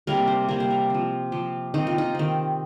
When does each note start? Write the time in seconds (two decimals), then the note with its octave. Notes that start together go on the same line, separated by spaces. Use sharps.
0.07 C3 G3 A#3 A#4
0.27 C5
0.49 C3 G3 A#3 A#4
0.60 C5
0.70 A#4
0.90 F3 C4
1.32 F3 C4 G4
1.74 D#3 C4 D#4
1.87 F4
1.98 D#4
2.15 D#3 C4